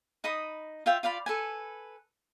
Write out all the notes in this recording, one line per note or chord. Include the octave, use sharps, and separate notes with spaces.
D#4 D#5 B5 D#6
F4 E5 F5 G5
F4 D5 F5 B5
A4 B4 G#5